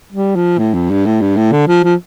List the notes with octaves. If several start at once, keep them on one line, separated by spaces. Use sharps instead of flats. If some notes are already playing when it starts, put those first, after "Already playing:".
G3
F3
A2
F2
G2
A2
G2
A2
D3
F3
F3